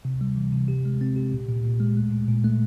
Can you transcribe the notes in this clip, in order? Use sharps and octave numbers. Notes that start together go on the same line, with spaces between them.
C3
G3
E3
C3
G4
G#3
C4
G4
A#2
A#2
A#2
G#3
A3
A#2
A#2
A3